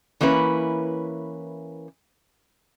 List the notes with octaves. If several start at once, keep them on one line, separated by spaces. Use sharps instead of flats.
E3 A#3 C#4 E4 B4